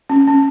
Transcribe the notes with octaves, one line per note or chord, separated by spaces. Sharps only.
C#4
C#4